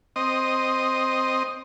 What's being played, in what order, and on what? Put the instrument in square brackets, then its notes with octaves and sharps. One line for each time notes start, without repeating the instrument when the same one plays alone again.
[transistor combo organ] C4 D#5